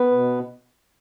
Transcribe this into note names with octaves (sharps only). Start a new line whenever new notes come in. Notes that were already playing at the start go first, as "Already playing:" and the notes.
Already playing: B3 B4
B2